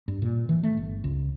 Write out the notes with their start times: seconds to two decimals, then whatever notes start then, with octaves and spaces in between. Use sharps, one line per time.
0.08 G2
0.22 A#2
0.49 E3
0.63 A3
0.77 G1
1.04 C#2